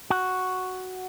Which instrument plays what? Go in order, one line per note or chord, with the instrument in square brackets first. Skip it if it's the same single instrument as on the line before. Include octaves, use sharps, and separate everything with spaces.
[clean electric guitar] F#4